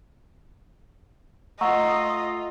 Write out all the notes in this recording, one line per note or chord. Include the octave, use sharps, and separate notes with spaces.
A3 F4 D#5 F5 F#5 A#5 C#6 E6